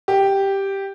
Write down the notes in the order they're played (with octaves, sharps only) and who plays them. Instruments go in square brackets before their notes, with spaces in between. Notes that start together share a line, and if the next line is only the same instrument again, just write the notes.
[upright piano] G4